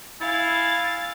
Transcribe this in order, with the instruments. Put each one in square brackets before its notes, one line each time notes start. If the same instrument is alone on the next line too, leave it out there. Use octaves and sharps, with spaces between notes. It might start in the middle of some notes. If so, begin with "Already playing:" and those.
[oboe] E4 [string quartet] F5 [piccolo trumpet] G#5 [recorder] A6